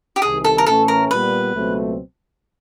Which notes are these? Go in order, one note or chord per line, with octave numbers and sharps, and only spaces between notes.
G4
C2 C3 D#3 G#4
A4
A#4
A2 E3 A3 C#4 A4
A#4
A#2 G3 B3 B4
C#2 B2 F#3 A3 C4